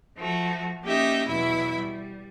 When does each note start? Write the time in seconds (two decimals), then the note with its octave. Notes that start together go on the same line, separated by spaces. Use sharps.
0.16 F3 A3 F#4
0.82 A#3 C#4 D#4 G4 D#5 E5
1.27 E2 B2 F#3 E4 E5 B5
1.74 G3